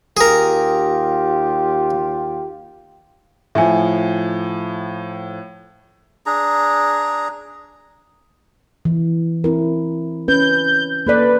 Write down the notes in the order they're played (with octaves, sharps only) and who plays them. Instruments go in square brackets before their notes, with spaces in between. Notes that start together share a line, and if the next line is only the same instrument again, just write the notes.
[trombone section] D#2 F4 G4 [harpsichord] G#4 A#4
[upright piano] A2 F3 [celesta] E5 G#5
[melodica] D4 G#4 A#5
[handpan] E3
C4 E4 A#4
[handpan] C#4 B4 [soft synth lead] G6
[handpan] A#3 A4 D5 [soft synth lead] B4